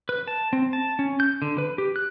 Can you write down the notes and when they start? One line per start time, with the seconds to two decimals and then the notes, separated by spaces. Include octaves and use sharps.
0.09 B4
0.28 A5
0.53 C4
0.73 A5
0.99 C#4
1.20 G6
1.42 D3
1.58 B4
1.78 G4
1.96 F#6